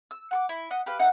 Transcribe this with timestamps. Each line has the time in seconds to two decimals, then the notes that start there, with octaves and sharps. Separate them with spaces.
0.11 E6
0.31 F#5 C#6 D6
0.49 E4
0.70 D#5 F#5
0.86 G4 B4 F5
0.99 A3 D#4 F#5